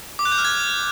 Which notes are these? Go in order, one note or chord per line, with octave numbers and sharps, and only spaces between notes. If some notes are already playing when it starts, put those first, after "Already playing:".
D6
F#6
G6
F6
G#6